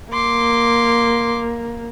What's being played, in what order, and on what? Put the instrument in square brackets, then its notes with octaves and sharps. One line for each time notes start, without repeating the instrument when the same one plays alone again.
[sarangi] A#3 [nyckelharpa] C6 D6